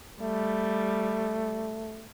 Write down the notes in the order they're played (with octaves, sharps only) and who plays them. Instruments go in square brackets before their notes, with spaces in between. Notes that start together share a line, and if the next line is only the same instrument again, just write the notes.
[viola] G3 [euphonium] A3